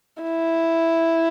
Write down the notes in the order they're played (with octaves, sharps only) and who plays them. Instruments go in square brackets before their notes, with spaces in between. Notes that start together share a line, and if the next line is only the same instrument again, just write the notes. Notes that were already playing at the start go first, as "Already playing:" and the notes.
[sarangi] E4